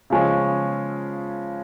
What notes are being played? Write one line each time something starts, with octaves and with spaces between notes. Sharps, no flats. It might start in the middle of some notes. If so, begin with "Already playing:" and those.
C#3 F3 G#3 C#4